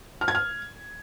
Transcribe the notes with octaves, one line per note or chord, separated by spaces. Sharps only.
F6
G#6
F6